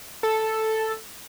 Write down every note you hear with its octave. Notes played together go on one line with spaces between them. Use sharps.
A4